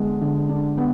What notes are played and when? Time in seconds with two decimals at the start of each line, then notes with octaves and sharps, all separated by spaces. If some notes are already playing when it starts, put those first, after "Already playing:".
Already playing: D3 G#3 B3
0.21 D3
0.49 D4
0.78 B3